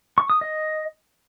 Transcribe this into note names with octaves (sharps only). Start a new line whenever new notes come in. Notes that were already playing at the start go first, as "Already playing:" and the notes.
C#6
D#6
D#5